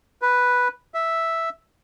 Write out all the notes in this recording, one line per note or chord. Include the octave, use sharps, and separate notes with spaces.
B4
E5